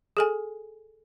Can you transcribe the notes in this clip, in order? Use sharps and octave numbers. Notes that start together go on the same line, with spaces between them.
G#4 A4 G#5